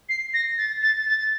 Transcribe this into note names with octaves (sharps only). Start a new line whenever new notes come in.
C7
A#6
A6
A6
A6